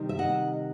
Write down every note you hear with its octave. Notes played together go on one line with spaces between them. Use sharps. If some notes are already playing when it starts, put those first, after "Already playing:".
Already playing: C3 D#3 G3
E5
D#5 F#5